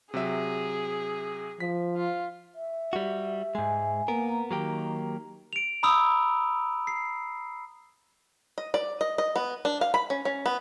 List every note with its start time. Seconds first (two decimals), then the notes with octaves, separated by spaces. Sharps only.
0.14 C3 F#3 G#4 E5
1.60 F3 B6
1.96 F4
2.55 E5
2.93 G3 F#4
3.55 G#2 G#3 G#5
4.08 A#3 B3 A#4
4.29 A#5
4.51 D#3 F#3 A#3 G4
5.53 D7 F7
5.83 A#5 B5 D#6 E6 F7
6.87 C7
8.58 D#5
8.74 D5
9.01 D#5
9.18 D#5
9.36 B3
9.65 D4
9.81 F5
9.94 B5
10.10 C#4
10.25 C#4
10.46 B3